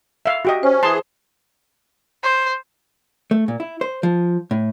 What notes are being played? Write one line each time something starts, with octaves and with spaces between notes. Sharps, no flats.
E5 F5
F#4 G4 D#5
C#4 C5
E3 G#4 A5 C6
C5
A3
A#2
E4
C5
F3
A2